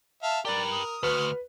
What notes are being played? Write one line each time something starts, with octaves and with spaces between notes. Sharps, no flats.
E5 F5 A5
G4 A#4 B4 D5
D#6
D2 F#4 B4 F6